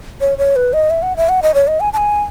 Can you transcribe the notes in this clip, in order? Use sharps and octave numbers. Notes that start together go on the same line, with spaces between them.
C#5
C#5
B4
D#5
E5
F#5
E5
F#5
D#5
C#5
D#5
G#5
A5
G#5